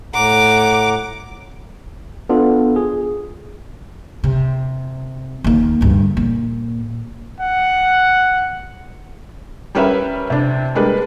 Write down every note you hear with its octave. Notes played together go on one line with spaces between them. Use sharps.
A2 F#5 A#5 D6
B3 D4 F4 A4
G#4
C3
D#2 A#3
D2 G2
A#2
F#5
G3 C#4 A#4 B4 C#5 E5
C3 D4
G3 G#3 A#3 D4 B4